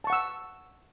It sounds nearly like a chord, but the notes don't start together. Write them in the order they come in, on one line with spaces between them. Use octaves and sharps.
A5 C#6 F#5 E6